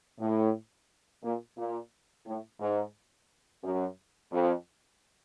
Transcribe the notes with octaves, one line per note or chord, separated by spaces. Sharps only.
A2
A#2
A#2
A2
G#2
F#2
F2